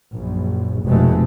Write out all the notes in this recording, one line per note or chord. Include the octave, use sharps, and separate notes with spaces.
A#1 F#2
F1 B2 G#3 A3